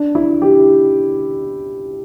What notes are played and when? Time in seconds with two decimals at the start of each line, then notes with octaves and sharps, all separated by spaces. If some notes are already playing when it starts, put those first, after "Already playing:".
Already playing: D4
0.15 E4
0.42 G4